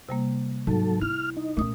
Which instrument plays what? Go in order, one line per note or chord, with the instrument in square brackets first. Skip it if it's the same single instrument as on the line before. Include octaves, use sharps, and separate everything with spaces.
[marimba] C3 G3 A#3
[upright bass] G#2 [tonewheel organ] F#3 A4
[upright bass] E4 [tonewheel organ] F6
[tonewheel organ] D#4
[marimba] A#2 D#6 [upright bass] A3 C#4